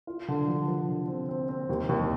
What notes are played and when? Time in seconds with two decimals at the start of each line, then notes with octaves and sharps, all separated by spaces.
0.07 F4
0.28 D3
0.48 F3
0.68 F3
0.89 D3
1.08 C4
1.29 C4
1.49 C4
1.69 D#2
1.89 D#2